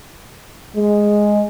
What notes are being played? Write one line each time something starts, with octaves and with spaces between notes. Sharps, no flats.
G#3